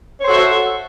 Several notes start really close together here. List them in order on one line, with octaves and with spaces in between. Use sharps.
C#5 C5 A4 F#4 E5